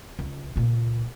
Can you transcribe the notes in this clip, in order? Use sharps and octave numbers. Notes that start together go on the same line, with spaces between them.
C#2
C#2 A#2